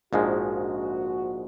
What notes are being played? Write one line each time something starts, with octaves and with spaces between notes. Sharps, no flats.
A#1 G#2 F3 G#3 F#4